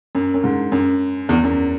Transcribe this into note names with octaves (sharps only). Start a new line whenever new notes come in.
F#2
F#2
G#2
F#2
E2
F#2